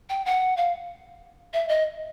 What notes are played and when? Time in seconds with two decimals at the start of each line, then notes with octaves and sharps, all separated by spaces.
0.09 G5
0.26 F#5
0.57 F5
1.53 E5
1.69 D#5